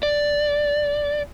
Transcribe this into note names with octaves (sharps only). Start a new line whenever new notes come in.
D5